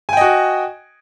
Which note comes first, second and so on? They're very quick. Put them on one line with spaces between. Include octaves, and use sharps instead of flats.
G#5 G5 D#5 F#4